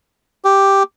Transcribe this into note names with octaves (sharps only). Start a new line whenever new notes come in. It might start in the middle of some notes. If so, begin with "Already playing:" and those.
G4